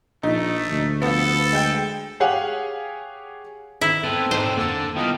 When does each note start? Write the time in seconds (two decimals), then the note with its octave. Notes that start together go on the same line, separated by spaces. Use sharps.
0.23 A#1 A3 D#4
0.70 D2
1.02 F3 B3 A4
1.53 G#3 G5
2.20 G4 G#4 C#5 F5 F#5 G#5
3.81 D#3 E4
4.04 B3 C4 F4 A4
4.31 G#2 D4 D#4 C5 C#5
4.57 F2 D3 A#3 A4 A5 E6
4.96 D#3 G3 B3 E4 F4 D#5 F5 G5